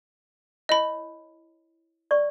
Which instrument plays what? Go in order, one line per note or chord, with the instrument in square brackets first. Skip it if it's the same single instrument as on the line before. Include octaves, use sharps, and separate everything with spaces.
[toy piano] E4 C#5 [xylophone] D#5 B5
[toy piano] D5 C#6